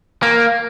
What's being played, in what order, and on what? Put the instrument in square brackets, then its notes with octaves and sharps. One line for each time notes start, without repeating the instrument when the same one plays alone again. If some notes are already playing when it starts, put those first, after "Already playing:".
[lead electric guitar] A#3